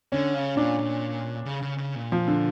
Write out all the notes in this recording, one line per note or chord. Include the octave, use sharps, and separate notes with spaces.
D3 C#4
C#3
A#2 D4
A#2
C#3
C#3
C#3
A#2
F3
D3